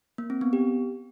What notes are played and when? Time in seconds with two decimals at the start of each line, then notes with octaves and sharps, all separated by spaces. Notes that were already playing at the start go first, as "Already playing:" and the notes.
0.18 A#3
0.30 C4
0.41 B3
0.53 G4